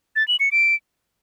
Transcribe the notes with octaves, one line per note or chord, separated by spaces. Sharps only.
A6
F#7
C#7
D7